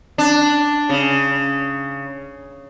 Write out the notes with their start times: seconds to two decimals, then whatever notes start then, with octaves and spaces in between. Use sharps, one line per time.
0.18 D4
0.89 C#3